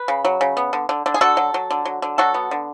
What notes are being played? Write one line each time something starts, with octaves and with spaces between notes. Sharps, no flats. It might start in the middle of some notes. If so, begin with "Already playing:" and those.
Already playing: B4
C#3
F#3
C#3
B3
D3
D3
D3
G#4
D3 F#4 A4
F#3
F#3
D3
F#3
D3
F#3 F#4 A4
B3
D3